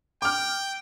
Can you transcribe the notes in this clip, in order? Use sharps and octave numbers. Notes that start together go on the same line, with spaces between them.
G5 D6 F6